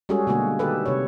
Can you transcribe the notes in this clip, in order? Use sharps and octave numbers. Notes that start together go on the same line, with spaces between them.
G3 G#3 C#4 F#4 G#4 A4
B2 D3 G#3 A#3 F#4 G#4
D#3 G4 A4 B4
C3 C#5